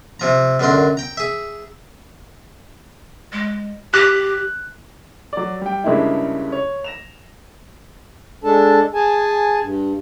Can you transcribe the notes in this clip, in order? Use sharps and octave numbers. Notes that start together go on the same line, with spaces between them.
C3 F3 A#5
C#2 F#2 A#2 D3 A#5 C6
G5 A#5
G#4 E5
G#3
G4 F#6
F#3 D5
G3 G5
G2 C#3 G#3 A#3 D4 E4
C#5
A#6 E7 F7
G#3 D4 A4 A5
G#4 G#5 A5
G2